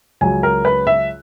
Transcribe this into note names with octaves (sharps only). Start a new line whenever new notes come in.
C#2 C#3 F#3 G#5
A#4
B4
E5